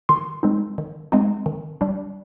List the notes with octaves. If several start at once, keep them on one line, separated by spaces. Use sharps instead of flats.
D#3 C6
G#3 C4 D#4
D#3
G#3 C4 D#4
D#3
G3 D4